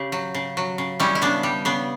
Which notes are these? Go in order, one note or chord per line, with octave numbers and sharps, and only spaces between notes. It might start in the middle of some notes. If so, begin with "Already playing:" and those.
Already playing: C#3 G4
F#3
C#3
F#3
C#3
G3 C#4 E4
E4
C#3 B3 D4
G3
C#3 B3